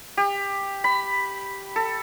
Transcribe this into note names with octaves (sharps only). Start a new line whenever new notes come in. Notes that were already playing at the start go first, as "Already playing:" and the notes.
G4
B5
A4